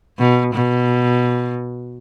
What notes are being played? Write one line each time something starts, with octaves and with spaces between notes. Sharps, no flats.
B2
B2